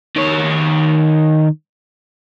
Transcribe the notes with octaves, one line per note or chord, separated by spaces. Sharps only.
D#3 C#5